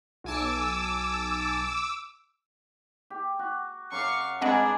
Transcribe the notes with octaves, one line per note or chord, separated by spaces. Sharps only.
B1 G#5 A5 D6 E6
G4
F#4
F#2 F5 C#6 D6
G2 G#3 C4 D4 G#4 D#5 F#5 A#5